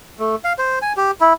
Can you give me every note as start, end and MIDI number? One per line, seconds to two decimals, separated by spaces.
0.19 0.36 57
0.44 0.53 77
0.58 0.79 72
0.82 0.93 80
0.97 1.11 67
1.21 1.33 64